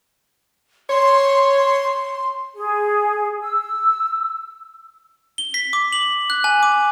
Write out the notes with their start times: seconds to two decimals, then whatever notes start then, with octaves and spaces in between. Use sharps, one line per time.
0.90 C#5 C6
2.56 G#4
3.41 E6
5.38 G7
5.54 B6
5.73 D6
5.93 F#7
6.30 F#6
6.44 G#5
6.63 D6